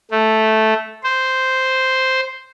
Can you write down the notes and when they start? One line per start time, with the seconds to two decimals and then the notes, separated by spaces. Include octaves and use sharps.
0.11 A3
1.03 C5